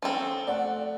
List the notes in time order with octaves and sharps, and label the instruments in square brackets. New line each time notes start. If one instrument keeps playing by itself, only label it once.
[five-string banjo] F3 C4 [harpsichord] C#4 A4
[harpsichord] A3 [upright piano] D5 F#5